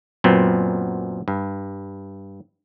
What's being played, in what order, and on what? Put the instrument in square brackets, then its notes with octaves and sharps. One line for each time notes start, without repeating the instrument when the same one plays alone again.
[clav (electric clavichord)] F#2 A#2 B3 C4
G2